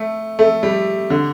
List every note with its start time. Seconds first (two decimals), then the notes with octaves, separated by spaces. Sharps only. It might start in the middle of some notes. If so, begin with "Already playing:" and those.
Already playing: A3
0.39 A3
0.63 G3
1.10 D3